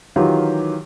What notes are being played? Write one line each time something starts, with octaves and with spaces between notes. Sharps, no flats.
D#3 E3 F#3 F4 G4